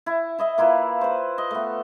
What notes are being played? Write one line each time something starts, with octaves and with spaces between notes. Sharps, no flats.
E4
E4 D#5 E5
A#3 E4 F4 B4
B4 C5
D#5
A3 B3